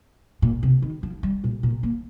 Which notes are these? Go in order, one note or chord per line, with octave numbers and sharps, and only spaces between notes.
A#2
C3
D#3
F3
G3
A#2
A#2
A#3